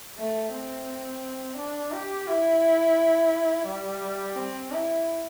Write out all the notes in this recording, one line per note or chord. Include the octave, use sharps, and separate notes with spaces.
A3
C4
D4
G4
E4
G3
C4
E4